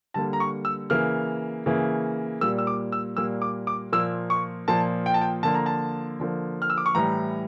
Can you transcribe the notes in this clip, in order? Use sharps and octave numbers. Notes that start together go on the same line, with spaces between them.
D3 G3 A#3 A5
A#5
C#6
E6
C#3 E3 A#3 F6
C#3 E3 A#3
A#2 G3 A#3 E6
E6
D6
E6
A#2 G3 A#3 E6
D6
D6
A#2 F3 A#3 E6
C#6
A#2 F3 A#3 A5
G5
A5
G5
D3 F3 A#3 A5
A#5
A5
D3 F3 A#3
F6
E6
D6
C#6
A2 E3 G3 A#5